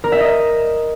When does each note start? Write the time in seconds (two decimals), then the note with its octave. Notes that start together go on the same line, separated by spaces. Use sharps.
0.04 A#4
0.12 E5
0.20 D#5